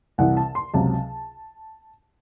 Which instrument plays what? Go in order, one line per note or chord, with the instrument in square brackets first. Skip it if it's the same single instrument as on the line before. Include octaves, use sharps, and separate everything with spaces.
[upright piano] C2 C3 E3 F#5
A5
C6
C#2 C3 F#3 A5